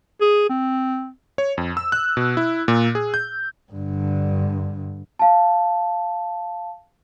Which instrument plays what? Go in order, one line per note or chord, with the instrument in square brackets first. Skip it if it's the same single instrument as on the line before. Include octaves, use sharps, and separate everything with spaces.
[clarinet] G#4
C4
[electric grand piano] C#5
F2
E6
F#6
B2
E4
A#2
G#4
G6
[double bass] G2 D3
[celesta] F5 A5